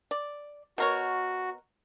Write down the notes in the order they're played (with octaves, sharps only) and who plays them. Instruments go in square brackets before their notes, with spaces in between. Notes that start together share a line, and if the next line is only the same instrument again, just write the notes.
[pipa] D5
[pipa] B2 A#4 C#5 [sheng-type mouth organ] F#4